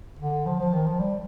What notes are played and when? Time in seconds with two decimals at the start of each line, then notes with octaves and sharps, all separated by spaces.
0.19 D3
0.46 F3
0.60 F3
0.73 D#3
0.87 F3
1.00 G3